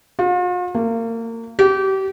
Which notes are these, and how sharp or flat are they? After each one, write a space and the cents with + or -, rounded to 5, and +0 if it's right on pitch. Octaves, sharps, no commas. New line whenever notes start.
F4 +45
A#3 -30
G4 -30